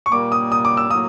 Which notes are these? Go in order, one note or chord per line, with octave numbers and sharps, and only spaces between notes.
C#6
A#2 G3 A#3 D6
D#6
D#6
D6
E6
A2 F#3 A#3 D#6